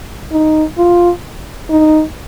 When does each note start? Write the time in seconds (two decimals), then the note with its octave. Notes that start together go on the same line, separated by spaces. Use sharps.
0.32 D#4
0.78 F4
1.70 D#4